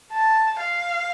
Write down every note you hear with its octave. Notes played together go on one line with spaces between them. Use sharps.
A5
F5